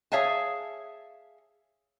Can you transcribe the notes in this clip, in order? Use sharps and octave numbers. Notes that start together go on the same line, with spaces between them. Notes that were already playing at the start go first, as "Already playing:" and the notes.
G#4 C#5 E5 F5 G#5 A5